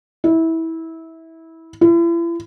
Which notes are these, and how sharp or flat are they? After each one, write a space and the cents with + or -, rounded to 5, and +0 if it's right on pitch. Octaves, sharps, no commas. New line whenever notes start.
E4 -20
E4 +40